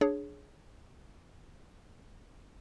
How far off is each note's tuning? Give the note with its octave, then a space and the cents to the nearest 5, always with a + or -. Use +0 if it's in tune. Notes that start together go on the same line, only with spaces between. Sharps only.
D4 +0 G#4 +10 C#5 +0